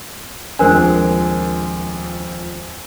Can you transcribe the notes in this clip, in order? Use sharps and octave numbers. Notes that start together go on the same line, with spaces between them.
D#1 F2 G#3 D4 A#4 C5 G#5